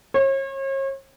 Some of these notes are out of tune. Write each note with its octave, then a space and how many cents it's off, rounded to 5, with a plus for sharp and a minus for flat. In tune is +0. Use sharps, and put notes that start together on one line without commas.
C#5 -40